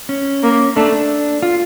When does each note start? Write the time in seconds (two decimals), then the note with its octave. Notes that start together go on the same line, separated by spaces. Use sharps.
0.09 C#4
0.43 A#3
0.76 A3 D4
0.92 D4
1.42 F4